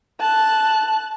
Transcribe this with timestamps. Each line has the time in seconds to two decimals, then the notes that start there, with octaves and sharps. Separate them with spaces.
0.20 A5 F#6